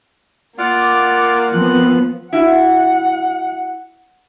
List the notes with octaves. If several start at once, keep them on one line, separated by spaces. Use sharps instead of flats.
A#3 F4 D5 F#5 D6
F3 B3 C4 F#6
E4 F#4 F#5